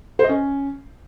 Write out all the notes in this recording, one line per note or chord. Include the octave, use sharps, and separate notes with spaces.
C5
D#5
C#4